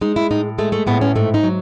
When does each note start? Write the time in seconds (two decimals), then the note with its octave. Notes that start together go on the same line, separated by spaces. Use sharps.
0.01 G#3 D#4
0.16 E4
0.31 A2 D#4
0.58 G#3 A3
0.72 A3
0.87 A2 B3
1.01 C#4
1.15 G#2 A3
1.34 D#4
1.43 F#3